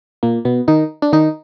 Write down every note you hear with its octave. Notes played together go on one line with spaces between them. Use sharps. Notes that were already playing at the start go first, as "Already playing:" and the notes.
A#2 A#3
B2 B3
D#3 D#4
D4
D#3 D#4